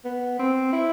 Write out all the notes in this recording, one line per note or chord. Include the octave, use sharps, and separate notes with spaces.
B3
C4
E4